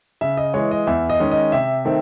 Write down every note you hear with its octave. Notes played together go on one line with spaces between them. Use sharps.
C#3 E5
D#5
E3 G#3 C#5
D#5
E2 E5
D#5
D#3 G#3 C#4
D#5
C3 E5
D#3 A3 C4